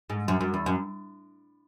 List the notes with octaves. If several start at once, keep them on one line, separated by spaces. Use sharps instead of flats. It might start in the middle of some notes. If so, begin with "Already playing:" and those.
G#2
F#2
F#2
E2
F#2